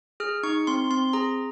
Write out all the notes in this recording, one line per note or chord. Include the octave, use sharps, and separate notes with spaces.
G#4 F6
D#4 C#6
C4 C6
C4 C6
G#4 A#5